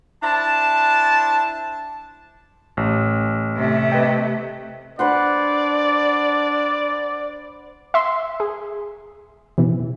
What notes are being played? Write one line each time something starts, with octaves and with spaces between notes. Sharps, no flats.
D4 E4 C5 A5
A1
C3 A3
B4 D#5 G5
D4 B4 C5 D5 F#5
E5 C6
G#4
B2 E3